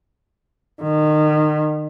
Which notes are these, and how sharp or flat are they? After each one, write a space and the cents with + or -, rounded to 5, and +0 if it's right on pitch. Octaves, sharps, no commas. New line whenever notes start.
D#3 -30